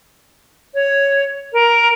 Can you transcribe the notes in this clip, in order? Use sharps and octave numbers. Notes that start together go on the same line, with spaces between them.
C#5
A#4